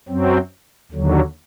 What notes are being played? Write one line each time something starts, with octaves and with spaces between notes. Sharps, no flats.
F#2 F#3 C4
D#2 D3 F#3